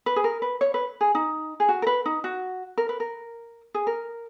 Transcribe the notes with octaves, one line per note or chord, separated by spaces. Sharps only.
B4
G#4
A#4
B4
C#5
B4
G#4
D#4
G#4
F#4
A#4
B4
D#4
F#4
A#4
B4
A#4
G#4
A#4